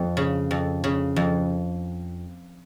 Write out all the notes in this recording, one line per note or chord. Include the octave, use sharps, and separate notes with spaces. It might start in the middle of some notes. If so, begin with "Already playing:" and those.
Already playing: F2
C#3
F2
C#3
F2